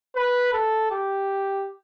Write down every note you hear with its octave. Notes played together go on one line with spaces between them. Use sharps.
B4
A4
G4